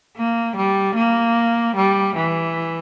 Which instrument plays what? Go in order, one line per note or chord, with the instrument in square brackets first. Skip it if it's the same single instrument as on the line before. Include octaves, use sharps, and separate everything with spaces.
[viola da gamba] A#3
G3
A#3
G3
E3